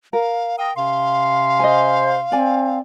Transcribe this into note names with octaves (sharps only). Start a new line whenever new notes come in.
A#4 F5
F5 G5 A#5 D#6
C3 C#4 F5 C6
C5 D#5 G#5
C4 D5 G#5